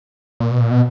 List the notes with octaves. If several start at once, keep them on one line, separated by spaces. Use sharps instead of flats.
A#2
B2
A#2
B2